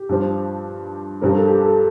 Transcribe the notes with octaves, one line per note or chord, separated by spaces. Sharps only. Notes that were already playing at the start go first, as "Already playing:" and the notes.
Already playing: G4
G2 F3
G2 F3 A#4
A4
G4
A4